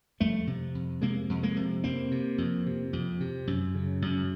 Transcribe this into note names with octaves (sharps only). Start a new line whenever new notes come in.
F2 G3 A3
C3
F2
C3 G#3 A#3
F2
G#3 A#3
C3
F2 A#3 C4
C3
F2
C3
F2
C3
F#2
C#3
F#2